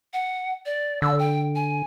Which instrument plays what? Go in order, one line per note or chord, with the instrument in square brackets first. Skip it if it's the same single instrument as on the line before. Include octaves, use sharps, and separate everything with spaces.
[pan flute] F#5
D5
[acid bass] D3 [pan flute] E6
[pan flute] G5
G#5